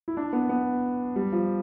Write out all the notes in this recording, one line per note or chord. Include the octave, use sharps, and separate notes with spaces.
E4
D4
B3
B3
G3
F3